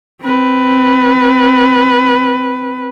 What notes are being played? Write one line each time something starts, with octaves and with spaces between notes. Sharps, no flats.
C4 B4